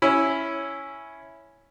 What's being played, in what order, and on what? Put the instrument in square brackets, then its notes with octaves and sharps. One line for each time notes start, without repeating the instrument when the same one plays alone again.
[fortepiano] C#4 E4